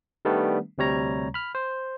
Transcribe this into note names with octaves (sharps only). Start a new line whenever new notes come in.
D#3 G3 A3 B3 D4
D2 C3 G3 C#5 A#5
B5 F6
C5